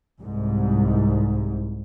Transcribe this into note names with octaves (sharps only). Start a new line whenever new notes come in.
C2 G#2